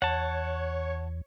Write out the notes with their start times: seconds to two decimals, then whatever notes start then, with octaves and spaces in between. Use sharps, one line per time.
0.02 E2 C#5 F#5 A5